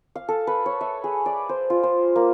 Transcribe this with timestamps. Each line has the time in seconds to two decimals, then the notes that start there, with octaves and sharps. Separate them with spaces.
0.16 F5
0.28 A4
0.47 B4
0.66 C#5
0.81 E5
1.04 G#4
1.26 D5
1.49 C5
1.70 F4
1.83 C5
2.16 A#3